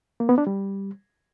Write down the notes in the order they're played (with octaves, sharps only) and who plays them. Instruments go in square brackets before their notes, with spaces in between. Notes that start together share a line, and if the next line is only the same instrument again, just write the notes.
[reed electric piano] A#3
B3
D4
G3